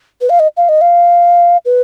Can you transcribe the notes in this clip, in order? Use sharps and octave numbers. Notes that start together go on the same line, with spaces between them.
B4
F5
D#5
F5
D#5
F5
B4